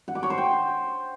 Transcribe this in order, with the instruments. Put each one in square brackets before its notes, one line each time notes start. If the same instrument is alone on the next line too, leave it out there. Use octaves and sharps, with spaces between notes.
[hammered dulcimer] F#5
D6
C#5
C5
G5